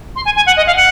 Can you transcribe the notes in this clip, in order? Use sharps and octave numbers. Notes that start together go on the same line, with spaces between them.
C6
G#5
G#5
F#5
D#5
F5
F#5